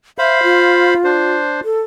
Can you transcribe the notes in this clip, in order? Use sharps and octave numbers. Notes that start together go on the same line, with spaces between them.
C5 E5 F5 B5
F4
D4 C5
A4